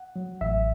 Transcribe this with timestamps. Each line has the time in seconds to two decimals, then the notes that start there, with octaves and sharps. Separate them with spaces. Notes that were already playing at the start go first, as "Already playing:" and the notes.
Already playing: F#5
0.16 F#3
0.41 A1 E5